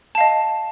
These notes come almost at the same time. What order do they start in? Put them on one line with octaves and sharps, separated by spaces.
A5 F5 D#5